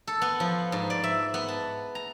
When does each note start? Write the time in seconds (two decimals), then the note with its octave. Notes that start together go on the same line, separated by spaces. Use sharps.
0.07 A4
0.22 B3
0.40 F3
0.72 G#2
0.90 D5
1.04 E5
1.34 B3
1.48 A5
1.95 A#5